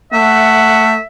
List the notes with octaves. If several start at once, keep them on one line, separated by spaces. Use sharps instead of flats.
A3 E5 F#5